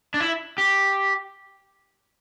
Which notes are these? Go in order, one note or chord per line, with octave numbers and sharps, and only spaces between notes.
D4
E4
G4